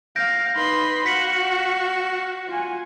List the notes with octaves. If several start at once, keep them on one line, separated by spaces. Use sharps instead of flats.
F5 G6 A#6 D7
D#4 B4 B5 C6
F#4 F5 B6 C#7 F#7
F4 G#5